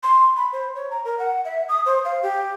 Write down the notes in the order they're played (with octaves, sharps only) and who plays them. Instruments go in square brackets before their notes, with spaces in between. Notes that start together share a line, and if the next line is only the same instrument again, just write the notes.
[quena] C6
B5
C5
C#5
A#5
A#4
F#5
E5
D#6
C5
F5
G4